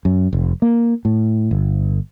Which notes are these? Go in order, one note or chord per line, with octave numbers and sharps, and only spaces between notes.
F#2
F1
A#3
A2
G1